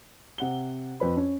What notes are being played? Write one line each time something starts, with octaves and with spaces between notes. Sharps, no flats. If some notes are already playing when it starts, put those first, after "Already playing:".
C3 F#5 G7
F2 B4 B5
C#4